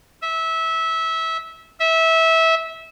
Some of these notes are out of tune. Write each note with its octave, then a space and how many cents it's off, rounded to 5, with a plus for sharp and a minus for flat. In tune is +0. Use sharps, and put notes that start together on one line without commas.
E5 -20
E5 -20